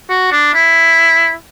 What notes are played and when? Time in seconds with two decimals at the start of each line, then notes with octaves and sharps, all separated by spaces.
0.10 F#4
0.32 D4
0.54 E4